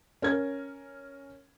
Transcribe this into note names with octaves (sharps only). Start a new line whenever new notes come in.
C#4 A#4 G#6